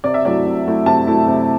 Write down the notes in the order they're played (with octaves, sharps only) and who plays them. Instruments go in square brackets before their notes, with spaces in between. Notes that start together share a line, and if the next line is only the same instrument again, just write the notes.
[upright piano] C3 D5
E5
F#3 A3 E4 D5
C3
F#3 A3 E4
C3 A5
F#3 A3 E4
C3